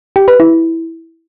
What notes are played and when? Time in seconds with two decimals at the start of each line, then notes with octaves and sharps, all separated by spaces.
0.16 G4
0.28 B4
0.40 E4